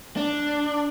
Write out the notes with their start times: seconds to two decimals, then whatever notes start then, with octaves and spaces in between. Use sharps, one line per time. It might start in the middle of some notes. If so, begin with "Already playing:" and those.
0.17 D4